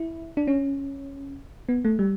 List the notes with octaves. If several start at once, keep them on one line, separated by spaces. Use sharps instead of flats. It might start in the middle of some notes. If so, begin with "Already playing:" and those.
Already playing: E4
D4
C#4
B3
A3
G3